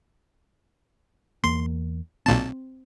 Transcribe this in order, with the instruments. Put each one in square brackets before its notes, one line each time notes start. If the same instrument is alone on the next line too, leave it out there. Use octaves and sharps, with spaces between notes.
[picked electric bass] E2 A#3 [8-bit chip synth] C6
[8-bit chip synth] B1 A#2 A5 [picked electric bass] C4